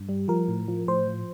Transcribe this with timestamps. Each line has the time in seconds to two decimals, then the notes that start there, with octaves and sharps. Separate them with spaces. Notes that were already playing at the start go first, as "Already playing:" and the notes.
Already playing: G2
0.09 G3
0.28 F3 A#4
0.48 A2
0.68 F3
0.88 A2 C5
1.07 F3